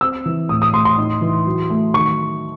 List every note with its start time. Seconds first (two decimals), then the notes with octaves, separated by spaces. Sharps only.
0.01 C4 E6
0.25 E3
0.49 A2 D#6
0.62 D#6
0.73 A2 C6
0.85 C6
0.98 D#4
1.21 E3
1.46 F#3
1.70 A3
1.94 D#3 C#6